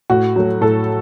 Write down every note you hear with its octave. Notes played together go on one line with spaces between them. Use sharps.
A2 F#4
F#3 A3
A2 A4